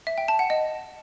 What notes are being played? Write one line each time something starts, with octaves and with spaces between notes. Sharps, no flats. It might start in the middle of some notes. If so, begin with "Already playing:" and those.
E5
G5
A5
F#5
D#5